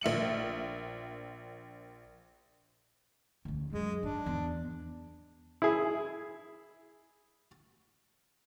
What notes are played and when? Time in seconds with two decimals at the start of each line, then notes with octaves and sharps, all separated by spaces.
0.01 A#1 E5 C#7 F#7
3.45 D2 C#3
3.73 F#2 G#3
4.03 G#2 D4
4.26 E2
5.62 E4 G#4